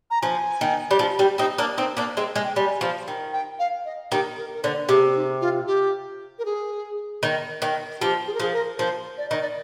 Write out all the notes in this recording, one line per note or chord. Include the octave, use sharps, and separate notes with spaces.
A#5
F3 G#5
D#3
G3
F3
G3
C4 D#4
A#3 D4
C4 D#4
A#3 D4
G#3 C4
G#3
G5
G3 G#5
F3
D#3
G5
F5
D#5
D#3 G4
A#4
A#4
D3 C5
C3 G#4
D#4
F4
G4
A#4
G#4
D#3
D#3
F3 G4
G#4
A#4
F3 G#4
A#4
F3 C5
D5
D#3 D#5
D5